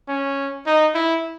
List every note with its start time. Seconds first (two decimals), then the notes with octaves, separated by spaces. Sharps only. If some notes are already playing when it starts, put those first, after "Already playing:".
0.08 C#4
0.66 D#4
0.95 E4